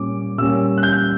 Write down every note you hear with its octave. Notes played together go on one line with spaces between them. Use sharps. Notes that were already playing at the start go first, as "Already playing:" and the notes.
Already playing: A#2 G3 C#4 D6
A#2 G3 C#4 E6
F#6
G6